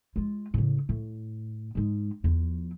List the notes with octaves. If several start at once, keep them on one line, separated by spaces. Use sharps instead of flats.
G#3 F4
A2 C#3
A2
G#2 G#3
E2 F3